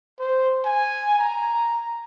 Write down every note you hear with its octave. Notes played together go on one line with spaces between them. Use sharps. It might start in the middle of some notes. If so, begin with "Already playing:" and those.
C5
G#5
A#5